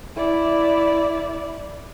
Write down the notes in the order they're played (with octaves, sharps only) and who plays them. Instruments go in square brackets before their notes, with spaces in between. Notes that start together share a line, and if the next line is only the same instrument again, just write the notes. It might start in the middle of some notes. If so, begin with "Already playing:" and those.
[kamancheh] E4 D5